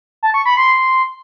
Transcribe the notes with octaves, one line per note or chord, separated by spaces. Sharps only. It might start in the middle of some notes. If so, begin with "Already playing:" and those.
A5
C#6
B5
C6